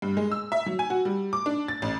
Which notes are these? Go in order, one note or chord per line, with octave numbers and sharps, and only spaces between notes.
G2
G#3
E6
E5
F#3
G#5
F#4
G3
D6
D4
A6
A1